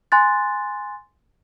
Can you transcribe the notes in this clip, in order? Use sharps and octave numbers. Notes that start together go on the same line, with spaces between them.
G#5 C6 F#6 A6